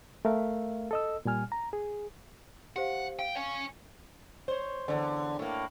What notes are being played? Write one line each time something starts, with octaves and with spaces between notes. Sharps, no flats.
A3 A#4 E5 F5
A4 D#5 E6
A#2 G3 G#5 F6
A#5
G#4
G4 C5 F5 F#5
F5 G5
C#5 G#5
C5 C#5
E2 G#2 D3
A2 A#3